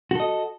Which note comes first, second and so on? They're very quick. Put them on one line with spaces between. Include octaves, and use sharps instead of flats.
F#4 A4 D#5